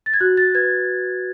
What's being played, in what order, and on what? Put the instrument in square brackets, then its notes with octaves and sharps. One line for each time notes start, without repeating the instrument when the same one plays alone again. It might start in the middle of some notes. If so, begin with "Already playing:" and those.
[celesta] A6
G#6
F#4 F#6
A6
B4 G#6